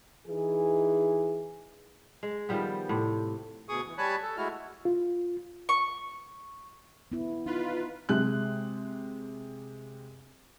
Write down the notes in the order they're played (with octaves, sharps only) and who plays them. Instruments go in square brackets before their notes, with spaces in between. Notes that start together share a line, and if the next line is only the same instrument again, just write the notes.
[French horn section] E3 D#4 G#4
[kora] G#3
D#3 F3 G3 B3
A2 C3
[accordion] D2 B2 G#4 C#6 D#6
E3
G3 C#5 G#5 A5 B5 F#6
A4
G#3 A3 E4 F#4 F6
[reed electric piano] F4
[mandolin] C#6
[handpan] B3 E4
[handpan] D#4 [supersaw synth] F4 B4
[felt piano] C3 G#3 F#6